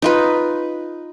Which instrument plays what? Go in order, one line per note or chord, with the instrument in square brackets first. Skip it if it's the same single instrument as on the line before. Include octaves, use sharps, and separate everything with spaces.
[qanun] D#4 F4 B4